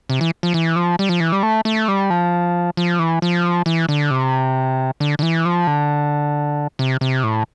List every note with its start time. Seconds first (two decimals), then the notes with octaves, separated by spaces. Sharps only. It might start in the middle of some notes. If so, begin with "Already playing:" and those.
0.10 C3
0.21 E3
0.43 F3
0.54 E3
0.76 F3
0.99 G3
1.09 F3
1.20 E3
1.32 G3
1.43 A3
1.65 A3
1.88 G3
2.10 F3
2.77 F3
2.99 E3
3.22 F3
3.66 E3
3.89 D3
4.11 C3
5.00 D3
5.19 D3
5.23 E3
5.45 F3
5.67 D3
6.79 C3
7.01 C3
7.23 A2